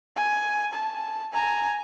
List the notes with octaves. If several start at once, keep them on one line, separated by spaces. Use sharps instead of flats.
G#5
A5
G#5 A#5